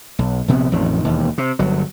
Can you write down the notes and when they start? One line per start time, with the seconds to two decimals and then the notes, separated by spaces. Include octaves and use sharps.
0.19 B1
0.48 A#1 C3 B3
0.72 A1 F2 D#3
1.04 E1 D#2
1.38 C3
1.59 G1 F#3